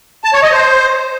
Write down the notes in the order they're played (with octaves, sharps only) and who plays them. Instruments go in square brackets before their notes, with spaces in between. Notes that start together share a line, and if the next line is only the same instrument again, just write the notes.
[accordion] A5
C#5
D#5
C5